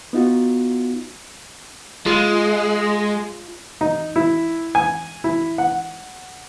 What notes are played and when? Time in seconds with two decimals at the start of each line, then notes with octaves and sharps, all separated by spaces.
0.13 B3 D#4 F4 F#4
2.06 G#3 F4
3.81 D#4
4.16 E4
4.75 G#5
5.24 E4
5.58 F#5